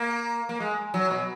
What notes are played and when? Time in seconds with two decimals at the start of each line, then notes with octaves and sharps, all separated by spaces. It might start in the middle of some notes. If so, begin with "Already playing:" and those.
Already playing: A#3
0.49 A#3
0.60 G#3
0.94 F#3
1.11 B2